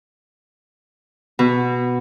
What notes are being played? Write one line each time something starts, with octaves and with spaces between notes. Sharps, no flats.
B2